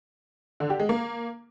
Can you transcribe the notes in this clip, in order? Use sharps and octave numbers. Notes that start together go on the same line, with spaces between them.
D3
G4
G#3
A#3